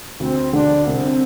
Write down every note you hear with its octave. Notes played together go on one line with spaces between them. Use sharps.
D2 C4
D3 D4
C2 C4